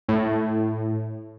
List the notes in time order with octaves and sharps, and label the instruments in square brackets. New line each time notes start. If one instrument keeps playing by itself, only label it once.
[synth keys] A2